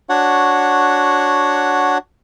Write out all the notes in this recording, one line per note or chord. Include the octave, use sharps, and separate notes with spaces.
D4 F#4 C#5 F#5